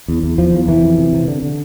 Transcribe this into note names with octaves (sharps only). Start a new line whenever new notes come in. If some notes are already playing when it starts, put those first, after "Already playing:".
E2
E2
E2 F3
E2
C3 E3
F2
C3
C3
D3
D3